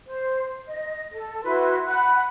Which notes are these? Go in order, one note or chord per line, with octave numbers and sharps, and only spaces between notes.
C5
D#5
A4
E4 F#4 B4 C6
F#5 B5 F#6